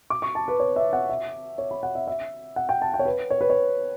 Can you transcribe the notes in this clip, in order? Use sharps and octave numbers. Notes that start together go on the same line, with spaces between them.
D6
C#6
A5
B4
C#5
E5
F#5
E5
C#5
B5
F#5
E5
E5
F#5
G5
A5
G5
C#5
B4
C#5
B4
C#5